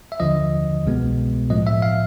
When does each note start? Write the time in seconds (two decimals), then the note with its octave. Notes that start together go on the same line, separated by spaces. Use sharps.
0.12 E5
0.20 D#2 D3 F3 D#5
0.85 C2 B2 G#3 B3
1.50 A2 F3 A3 D#5
1.67 E5
1.82 F5